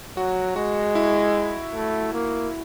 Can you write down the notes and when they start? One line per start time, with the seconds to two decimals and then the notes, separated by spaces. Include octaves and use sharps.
0.17 F#3 F#4
0.56 G#3 F#4
0.95 E4
1.74 A3
2.13 A#3